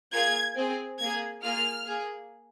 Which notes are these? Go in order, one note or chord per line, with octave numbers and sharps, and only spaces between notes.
A#3 F4 G#4 G#6
C4 G#4
A#3 G#4 G#6
A#3 F4 G#4 F6
A#3 G#4